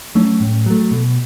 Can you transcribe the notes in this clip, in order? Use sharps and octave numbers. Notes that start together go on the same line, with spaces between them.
F#3 A3 C#4
A2
F#3 A3
B2